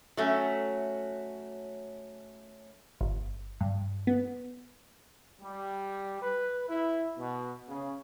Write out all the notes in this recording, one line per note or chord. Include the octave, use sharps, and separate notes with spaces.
F#3 A3 C#4
G1
G2
B3
G3
B4
E4
B2
C#3